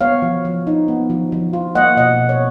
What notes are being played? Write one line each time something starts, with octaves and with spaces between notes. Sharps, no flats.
B3 C#5 F5
F3
F3
D#4
B3
F3
F3
F4
A#3 D#5 F#5
B2 D#5 F#5
B2
C#5